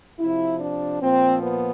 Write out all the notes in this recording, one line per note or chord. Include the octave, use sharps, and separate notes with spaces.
C3 F3 E4
D4
A#2 F3 C4
B3